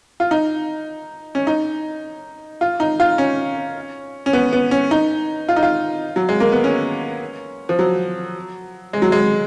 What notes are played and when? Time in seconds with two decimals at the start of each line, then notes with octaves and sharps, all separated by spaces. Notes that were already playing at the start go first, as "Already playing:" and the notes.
0.20 F4
0.31 D#4
1.35 C#4
1.47 D#4
2.61 F4
2.80 D#4
3.00 F4
3.18 C#4
4.26 C#4
4.33 B3
4.53 B3
4.71 C#4
4.91 D#4
5.49 F4
5.56 D#4
5.63 F4
6.16 F#3
6.29 G#3
6.40 A#3
6.52 B3
6.64 C#4
7.69 F3
7.79 F#3
8.93 G#3
9.02 F#3
9.12 G#3